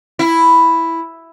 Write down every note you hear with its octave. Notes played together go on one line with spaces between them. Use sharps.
E4